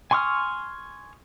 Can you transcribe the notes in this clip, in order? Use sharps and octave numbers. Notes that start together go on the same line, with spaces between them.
G#5 C6 C#6 D#6 F6